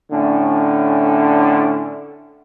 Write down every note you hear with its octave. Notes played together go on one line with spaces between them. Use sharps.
A2 D3 C#4 D4